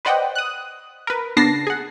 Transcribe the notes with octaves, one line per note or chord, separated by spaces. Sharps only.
B4 C5 D5 D#5 F#5 G5
D#6 F#6
A#4 B4
C#3 B3 D4 A5 A#6 C7
G#4 F#5